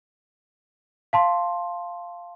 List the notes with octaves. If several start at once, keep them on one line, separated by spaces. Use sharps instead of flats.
F5 A5 C6